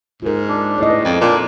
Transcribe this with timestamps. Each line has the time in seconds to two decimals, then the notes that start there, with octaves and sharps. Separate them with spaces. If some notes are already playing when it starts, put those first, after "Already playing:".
0.22 G#2 F4 A#4
0.48 D4
0.78 A2 C#5 D#5
0.90 B4
1.05 F2
1.21 A#2 D4